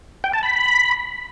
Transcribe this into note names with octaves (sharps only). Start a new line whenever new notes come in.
G5
A5
B5